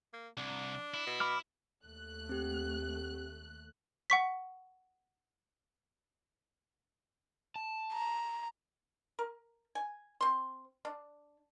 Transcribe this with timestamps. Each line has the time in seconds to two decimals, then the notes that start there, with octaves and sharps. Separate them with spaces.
0.13 A#3
0.37 C2 D4
0.94 E4
1.07 B2
1.20 B5 D6 F6
1.86 D#2 A3 F#6
2.29 C4 G4
4.10 F#5 C#6 B6
7.56 A5
7.93 A#5
9.19 A#4
9.75 G#5
10.21 C4 C6
10.85 D4